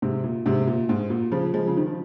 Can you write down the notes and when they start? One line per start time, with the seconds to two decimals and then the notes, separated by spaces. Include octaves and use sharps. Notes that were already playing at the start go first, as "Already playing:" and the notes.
0.02 G#2 C3
0.24 A#2
0.46 G#2 C3
0.67 A#2
0.89 G#2
1.10 A#2
1.32 C#3 F3
1.54 F3 G#3
1.67 C#3
1.77 D#3
1.86 F3